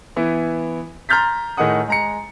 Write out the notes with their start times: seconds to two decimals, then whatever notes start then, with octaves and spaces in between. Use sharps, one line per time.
0.16 E3 B3 E4
1.09 A#5 C6 F6 G6 A6 B6
1.57 A2 D#3 D#4 G#4 F#5 D#6
1.88 G#3 A#5 C#7